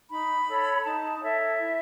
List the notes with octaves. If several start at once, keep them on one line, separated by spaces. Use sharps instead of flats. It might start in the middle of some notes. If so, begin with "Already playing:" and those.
D#4 B5
A4 C#5
D#4 A5
A4 C#5 E5
E4